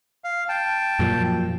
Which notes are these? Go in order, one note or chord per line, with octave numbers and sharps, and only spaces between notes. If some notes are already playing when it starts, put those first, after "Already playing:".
F5
G5 A5
F#2 A#2 F3